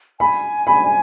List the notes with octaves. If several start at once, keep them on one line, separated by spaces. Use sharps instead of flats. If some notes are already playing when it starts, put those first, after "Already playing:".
G#5 B5
B5